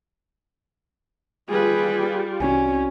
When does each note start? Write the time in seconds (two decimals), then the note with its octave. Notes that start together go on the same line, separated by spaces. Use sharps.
1.49 G3 F4 G4 G#4 B4
2.40 C2 C#4 F#4 D5 G#5